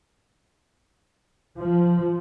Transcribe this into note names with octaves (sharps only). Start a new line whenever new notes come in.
F3